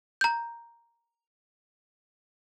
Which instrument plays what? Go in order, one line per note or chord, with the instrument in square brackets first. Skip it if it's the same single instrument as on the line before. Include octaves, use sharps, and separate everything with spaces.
[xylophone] A#5 G6